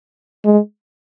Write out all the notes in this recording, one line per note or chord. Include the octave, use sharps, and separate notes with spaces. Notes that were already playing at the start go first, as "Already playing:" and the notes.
G#3